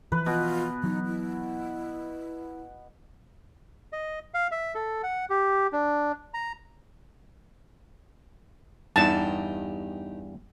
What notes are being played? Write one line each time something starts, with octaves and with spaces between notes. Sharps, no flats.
E3 F3 B4
B2 F4
E3 F#3 D#4
E4
D#5
F5
E5
A4
F#5
G4
D4
A#5
E2 G2 D#4 G4 A5